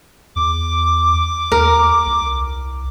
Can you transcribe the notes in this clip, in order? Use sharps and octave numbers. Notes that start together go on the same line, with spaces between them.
E2 D6
D#2 A#4
C2